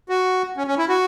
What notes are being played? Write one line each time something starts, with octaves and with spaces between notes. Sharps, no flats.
F#4
C#4
C#4
E4
F#4